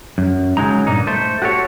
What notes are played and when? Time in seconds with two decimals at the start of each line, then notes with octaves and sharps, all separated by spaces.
0.18 F#2
0.57 C#3 F#3 G#3 D#4 A#5
0.87 G2 A#2 A#3 D#4
1.07 A3 C5
1.42 F#4 G4 A4 C#5